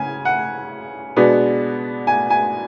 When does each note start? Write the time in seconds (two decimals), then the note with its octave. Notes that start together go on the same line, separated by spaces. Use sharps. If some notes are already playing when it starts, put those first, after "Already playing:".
Already playing: C#3 G#5
0.25 F#5
1.16 B2 G#3 B3 D4
2.07 G#5
2.30 G#5